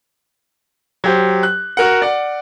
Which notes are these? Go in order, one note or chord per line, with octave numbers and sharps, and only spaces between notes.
F#3 G4 C5
F#6
F#4 A#4 F#5
D5 F#5